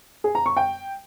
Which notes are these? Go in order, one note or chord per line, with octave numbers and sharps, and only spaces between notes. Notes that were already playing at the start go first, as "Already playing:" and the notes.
G#4
A#5
C#6
G5